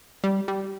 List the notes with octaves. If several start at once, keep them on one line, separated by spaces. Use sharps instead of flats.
G3
G3